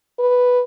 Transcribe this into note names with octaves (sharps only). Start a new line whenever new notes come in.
B4